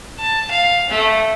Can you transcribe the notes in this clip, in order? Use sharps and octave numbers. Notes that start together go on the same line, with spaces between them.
A5
F5
A3